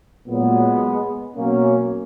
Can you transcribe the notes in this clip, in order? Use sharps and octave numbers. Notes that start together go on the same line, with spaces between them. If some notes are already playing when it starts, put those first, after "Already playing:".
A#2 F#3 G#3 B3
B2 F#3 A#3 C#4